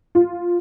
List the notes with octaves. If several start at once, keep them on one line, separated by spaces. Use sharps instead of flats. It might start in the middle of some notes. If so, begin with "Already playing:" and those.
F4